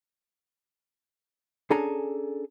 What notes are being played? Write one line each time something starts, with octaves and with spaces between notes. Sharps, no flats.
C#4 D4 G#4 A4 G#5 A#5